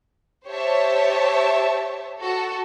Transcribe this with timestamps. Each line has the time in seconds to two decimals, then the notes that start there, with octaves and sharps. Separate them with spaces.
0.47 G4 C5 C#5 E5 A5
2.20 F#4 A4